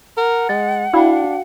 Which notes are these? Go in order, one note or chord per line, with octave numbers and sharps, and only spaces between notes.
A#4 F#5
G#3 A6
D4 E4 F#4 F5 G5